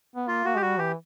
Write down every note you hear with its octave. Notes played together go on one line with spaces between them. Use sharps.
B3
A#3 F4
A#3 F#4
G#3 G4
G3 F#4
E3 G4